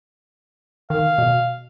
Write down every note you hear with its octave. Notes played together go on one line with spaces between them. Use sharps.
D#3 F5
B2